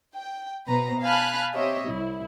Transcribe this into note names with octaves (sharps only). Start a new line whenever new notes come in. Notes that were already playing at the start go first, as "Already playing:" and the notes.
G5
B2 B4 C5 A#5
F5 G#5 A5 B5 F6 F#6
C4 G4 C#5 D#5 E5
C2 E4